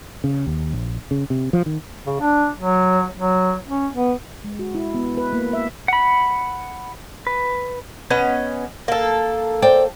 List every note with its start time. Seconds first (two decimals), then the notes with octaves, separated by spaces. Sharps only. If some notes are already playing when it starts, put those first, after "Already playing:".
0.24 C#3
0.47 D#2
0.73 A#1
1.11 C#3
1.30 C3
1.53 F3
1.66 D#3
2.05 C#3
2.20 D4
2.57 F#3
3.18 F#3
3.68 C#4
3.93 B3
4.44 G#3
4.59 F#4
4.75 E4
4.95 B3
5.17 B4
5.33 A#3
5.53 E5
5.88 F#5 B5
7.27 B4
8.10 B3 C#4 D#5
8.88 A#3 A4
9.62 C5 D5 G5